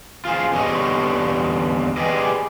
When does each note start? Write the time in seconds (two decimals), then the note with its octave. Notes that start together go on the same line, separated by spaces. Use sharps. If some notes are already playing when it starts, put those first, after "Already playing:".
0.25 F4 G#4 C5
0.53 E2 D3 G3 C#5 D#5
1.97 G4 G#4 B4 D5 D#5